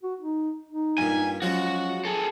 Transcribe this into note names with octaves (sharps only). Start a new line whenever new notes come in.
F#4
D#4
D#4
G2 A#2 G#5
F3 F#3 G#3 C#4 F#4
G#4 A4